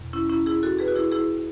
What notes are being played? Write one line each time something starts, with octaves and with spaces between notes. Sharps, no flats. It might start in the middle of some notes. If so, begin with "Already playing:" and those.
Already playing: E2 B2
C#4 E4
C#4 E4
E4 G#4
F#4 A4
G#4 B4
F#4
E4 G#4
E4 G#4